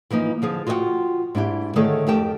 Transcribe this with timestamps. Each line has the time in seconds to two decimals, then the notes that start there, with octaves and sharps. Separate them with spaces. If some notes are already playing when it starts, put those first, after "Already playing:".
0.10 E3 F3 A#3 D#4
0.42 D3 F3 G#4
0.67 F4 F#4 B4 D#5 F#5 G5
1.35 G#2 D4 E4 G4
1.76 D3 D#3 A3 G#4 A4 C#5
2.07 F2 A3 G4 A#4 G5 A5